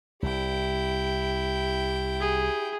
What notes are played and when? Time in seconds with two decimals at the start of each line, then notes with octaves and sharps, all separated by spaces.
0.23 C2 E4 G4 G5
2.20 G#4